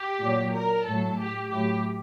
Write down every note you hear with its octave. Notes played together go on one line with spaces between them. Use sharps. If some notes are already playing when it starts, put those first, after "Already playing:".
Already playing: G4
A#2 F#3
A#4
A2 F#3 A4
G4
A2 F#3 G4